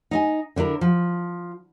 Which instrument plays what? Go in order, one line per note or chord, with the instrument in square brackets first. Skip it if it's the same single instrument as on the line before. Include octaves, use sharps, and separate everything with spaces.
[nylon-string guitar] D#4 D#5 G#5
D3 D4 E4 A#4
F3